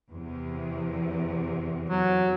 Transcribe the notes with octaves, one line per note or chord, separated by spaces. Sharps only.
E2 C3
F#3